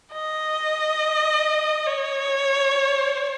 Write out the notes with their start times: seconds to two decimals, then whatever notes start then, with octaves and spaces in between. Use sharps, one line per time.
0.13 D#5
1.86 C#5